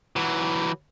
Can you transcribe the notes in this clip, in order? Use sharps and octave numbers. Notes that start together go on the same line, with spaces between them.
E3 F#3